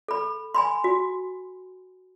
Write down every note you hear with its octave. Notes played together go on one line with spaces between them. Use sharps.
A4 B5
G#5 B5 C6
F#4